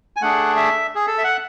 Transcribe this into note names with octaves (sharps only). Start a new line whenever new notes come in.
G#5
A3 D4 G#4 F#5
E5
G#4
A4
E5
F#5